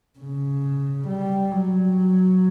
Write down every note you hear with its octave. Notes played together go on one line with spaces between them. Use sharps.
C#3
G3
F#3